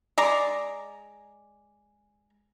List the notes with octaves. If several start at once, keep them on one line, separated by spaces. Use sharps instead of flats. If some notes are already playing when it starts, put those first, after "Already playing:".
G#3 D5 A#5